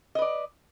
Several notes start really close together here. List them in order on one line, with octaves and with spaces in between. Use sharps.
D#5 B4 D5